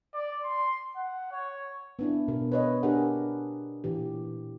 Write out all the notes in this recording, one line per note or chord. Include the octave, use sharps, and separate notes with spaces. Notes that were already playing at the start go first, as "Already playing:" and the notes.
D5
C6
F#5
C#5
B3 D4 E4
B2 A#4
B4 C#5 D#5
D4 G4 G#4 A#4 F#5
A#2 E3 G4